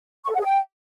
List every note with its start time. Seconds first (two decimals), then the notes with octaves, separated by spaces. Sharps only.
0.24 C#6
0.29 A4
0.34 F#5
0.39 G#4
0.44 G5